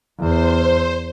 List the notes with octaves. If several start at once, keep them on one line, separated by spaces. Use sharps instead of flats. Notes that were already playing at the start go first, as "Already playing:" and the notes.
E2 C5